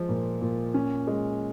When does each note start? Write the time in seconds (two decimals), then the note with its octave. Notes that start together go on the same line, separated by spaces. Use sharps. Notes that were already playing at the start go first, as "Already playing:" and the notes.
Already playing: F3 G#3
0.09 A#2
0.42 A#2
0.74 C#4
1.07 G#3